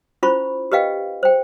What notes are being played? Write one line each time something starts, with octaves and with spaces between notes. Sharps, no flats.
C#4 E4 F4 C5 B5 C#6
G4 B4 D#5 F5 G5
C5 G5